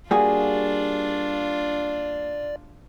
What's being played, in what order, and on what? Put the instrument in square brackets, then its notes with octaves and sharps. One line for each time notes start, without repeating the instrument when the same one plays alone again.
[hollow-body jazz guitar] G3 A#3 F#4 [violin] D4 F4 [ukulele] G#4 [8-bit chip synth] D5